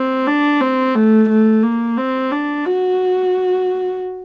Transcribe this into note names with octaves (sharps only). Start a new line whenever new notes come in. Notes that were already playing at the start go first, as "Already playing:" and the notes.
Already playing: C4
D4
C4
A3
A3
A#3
C4
D4
F#4